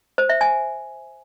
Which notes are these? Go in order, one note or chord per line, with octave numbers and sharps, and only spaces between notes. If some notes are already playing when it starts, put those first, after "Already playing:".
C5
E5
G#5